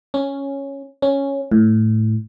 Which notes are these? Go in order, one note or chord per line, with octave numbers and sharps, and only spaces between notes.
C#4
C#4
A2